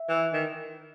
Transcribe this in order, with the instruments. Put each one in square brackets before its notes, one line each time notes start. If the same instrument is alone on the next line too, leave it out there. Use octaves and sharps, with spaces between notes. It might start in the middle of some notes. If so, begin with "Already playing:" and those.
Already playing: [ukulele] E5
[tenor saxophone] E3
D#3